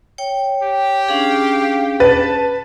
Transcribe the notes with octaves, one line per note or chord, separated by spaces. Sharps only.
C#5 G5
G4
C#4 D4 G#4 F5
B4 A5 A6